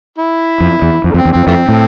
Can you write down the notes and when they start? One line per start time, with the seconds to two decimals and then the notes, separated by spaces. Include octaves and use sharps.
0.18 E4
0.60 F2
0.82 E2
1.04 F2
1.14 F2
1.17 C4
1.25 E2
1.32 F2 C4
1.47 F2 E3 A3 C4
1.69 A2